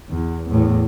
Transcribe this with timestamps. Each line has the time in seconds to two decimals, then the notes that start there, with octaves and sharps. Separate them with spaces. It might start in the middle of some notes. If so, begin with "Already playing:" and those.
0.10 E2
0.50 E2 A2